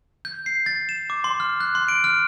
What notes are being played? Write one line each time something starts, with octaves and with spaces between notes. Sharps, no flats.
G6
C7
A6
E7
D6
C6
F6
F#6
C6
D7
F6